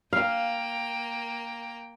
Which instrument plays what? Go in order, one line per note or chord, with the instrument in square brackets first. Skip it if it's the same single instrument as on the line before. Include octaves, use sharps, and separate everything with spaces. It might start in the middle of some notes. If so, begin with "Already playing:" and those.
[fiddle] A#3 G5 [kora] F5